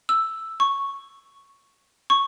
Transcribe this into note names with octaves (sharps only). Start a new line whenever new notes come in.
E6
C#6
C#6